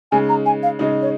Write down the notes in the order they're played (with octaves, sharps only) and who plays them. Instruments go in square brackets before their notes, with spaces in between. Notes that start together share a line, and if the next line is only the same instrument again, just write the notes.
[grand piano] C#3 G#3 D#4 [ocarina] G#5
[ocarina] A#5
G#5
F5
[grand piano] C#3 G#3 D#4 [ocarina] D#5
[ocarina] C#5